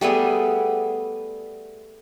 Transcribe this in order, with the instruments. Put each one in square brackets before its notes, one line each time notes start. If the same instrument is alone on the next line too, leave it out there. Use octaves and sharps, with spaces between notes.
[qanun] G3 A3 B3 G#4